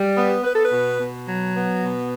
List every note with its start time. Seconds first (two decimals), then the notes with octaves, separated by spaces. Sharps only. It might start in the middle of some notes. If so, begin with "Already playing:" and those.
Already playing: G3
0.16 B3
0.43 B3 B4
0.53 A4
0.63 B4
0.71 B2
0.99 B2
1.27 F#3
1.54 B3
1.82 B2